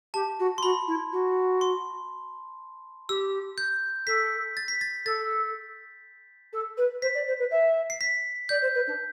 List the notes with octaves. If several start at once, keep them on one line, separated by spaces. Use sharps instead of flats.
G4 A5
F#4
C6
F#4 B5
E4
F#4
C6
G4 E6
G6
A4 B6
A6
B6
A6
A4 A6
A4
B4
C5 B6
D5
C5
B4
E5
C7
B6
D5 G6
C5
B4
D4